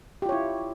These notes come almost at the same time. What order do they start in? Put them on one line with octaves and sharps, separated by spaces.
G4 F4 C#5 E4